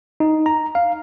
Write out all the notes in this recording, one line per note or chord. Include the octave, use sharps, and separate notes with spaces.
D#4
A#5
F5